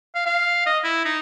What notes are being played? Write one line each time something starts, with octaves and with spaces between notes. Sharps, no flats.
F5
F5
D#5
E4
D#4